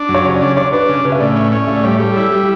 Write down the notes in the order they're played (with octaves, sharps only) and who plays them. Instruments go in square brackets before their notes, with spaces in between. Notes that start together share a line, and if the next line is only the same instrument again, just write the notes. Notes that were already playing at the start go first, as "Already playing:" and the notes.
Already playing: [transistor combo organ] D4
F#2
[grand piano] C#5
[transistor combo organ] C#3
[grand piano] D5
[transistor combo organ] D4
[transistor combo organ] D4 [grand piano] C#5
[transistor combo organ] D4 [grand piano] B4
[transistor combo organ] C#3
[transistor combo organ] C#3 [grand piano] B4
[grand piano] E5
[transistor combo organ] A2 [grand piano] D5
[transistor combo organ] C#4
C#4
[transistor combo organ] A2 [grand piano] E5
[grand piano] D5
[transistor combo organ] G3 [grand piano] C#5
[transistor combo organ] G3 [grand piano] A4
[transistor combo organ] E4 [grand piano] A4
[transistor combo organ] G3 [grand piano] G4